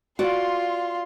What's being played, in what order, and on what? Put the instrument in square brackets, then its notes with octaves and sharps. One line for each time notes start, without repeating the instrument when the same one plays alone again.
[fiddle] F4 C6 [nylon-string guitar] F#4 D5